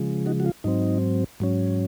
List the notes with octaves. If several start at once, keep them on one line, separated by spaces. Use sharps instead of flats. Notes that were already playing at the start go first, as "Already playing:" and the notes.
Already playing: C#3 F3 G#3
D#4 F#4
F#4
F4
G#2 F#3 C4 D#4
G#2 F#3 C#4